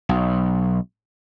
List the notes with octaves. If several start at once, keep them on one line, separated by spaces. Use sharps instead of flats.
B1